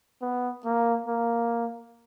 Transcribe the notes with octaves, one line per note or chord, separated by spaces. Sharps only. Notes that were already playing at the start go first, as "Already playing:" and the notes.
B3
A#3
A#3